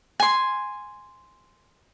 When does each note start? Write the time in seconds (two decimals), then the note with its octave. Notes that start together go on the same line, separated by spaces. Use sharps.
0.20 G#5 C6